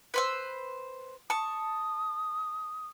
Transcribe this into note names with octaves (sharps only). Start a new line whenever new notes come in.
B4 C5 E6
A5 C#6 D#6